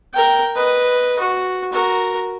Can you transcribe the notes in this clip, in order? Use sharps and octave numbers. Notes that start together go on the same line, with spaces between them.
A#4 G5
B4 D#5
F#4
F#4 A#4